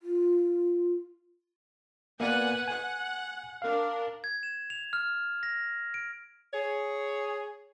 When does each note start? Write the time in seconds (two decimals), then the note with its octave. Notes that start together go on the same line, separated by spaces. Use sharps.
0.03 F4
2.20 A#3 B3 B4 D5 F#5 G#5
2.68 F#5 G#5
3.62 D4 A#4 F5
4.24 G#6
4.43 E7
4.70 F7
4.93 F6
5.43 A#6
5.94 D7
6.54 G#4 C#5